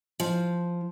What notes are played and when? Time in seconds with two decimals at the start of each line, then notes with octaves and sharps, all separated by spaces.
0.20 F3